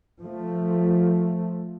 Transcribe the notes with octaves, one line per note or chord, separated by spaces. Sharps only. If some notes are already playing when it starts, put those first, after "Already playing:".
F3 A3